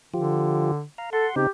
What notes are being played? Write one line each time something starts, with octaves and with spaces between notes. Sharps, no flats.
D3 F3 F4 G4
F5 A#5
A4 F#5 C6
C#3 C4 D#4 G4